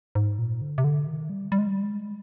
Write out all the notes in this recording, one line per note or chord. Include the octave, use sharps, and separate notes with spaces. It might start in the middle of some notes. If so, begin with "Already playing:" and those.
G#2
A#2
D3
C3
D3
D#3
G3
G3
G#3
G3
G#3